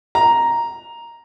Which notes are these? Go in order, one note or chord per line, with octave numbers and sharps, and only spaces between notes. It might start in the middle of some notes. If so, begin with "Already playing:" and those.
A#5